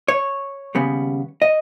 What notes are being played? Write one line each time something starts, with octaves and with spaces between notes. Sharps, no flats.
C#5
D#2 C#3 G3 B3
D#5